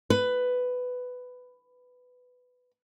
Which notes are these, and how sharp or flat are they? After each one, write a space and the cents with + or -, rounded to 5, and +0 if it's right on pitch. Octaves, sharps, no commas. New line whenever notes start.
B4 +10